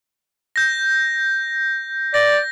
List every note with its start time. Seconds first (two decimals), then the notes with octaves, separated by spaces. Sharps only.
0.56 G6 A#6
2.14 D5 A#6